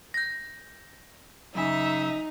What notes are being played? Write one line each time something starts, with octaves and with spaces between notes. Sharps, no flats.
G6 A#6
F#2 C#3 D#4 E5 G#5